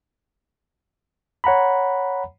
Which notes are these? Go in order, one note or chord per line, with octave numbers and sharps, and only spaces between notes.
C#5 F#5 A#5 B5